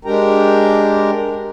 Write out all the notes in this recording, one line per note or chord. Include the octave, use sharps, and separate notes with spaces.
G#3 D4 G4 A#4 G5 A#5